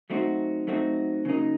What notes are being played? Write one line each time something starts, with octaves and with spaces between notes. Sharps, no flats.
F#3 A3 C4 D#4 F#4
F#3 A3 C4 D#4 F#4
C#3 F#3 A#3 D#4